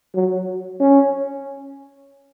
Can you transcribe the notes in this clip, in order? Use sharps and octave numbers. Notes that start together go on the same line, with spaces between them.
F#3
C#4